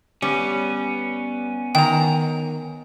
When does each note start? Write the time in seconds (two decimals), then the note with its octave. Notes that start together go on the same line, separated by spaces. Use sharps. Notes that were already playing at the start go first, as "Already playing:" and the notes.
0.22 G3 B3 C#4
1.75 D#3 G5 A#5